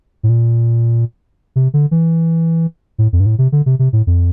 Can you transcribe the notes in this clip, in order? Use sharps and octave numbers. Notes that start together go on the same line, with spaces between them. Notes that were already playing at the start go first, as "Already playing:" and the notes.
A2
A#2
C3
D3
E3
A2
F2
G2
A2
C3
D3
C3
C3
A2
F2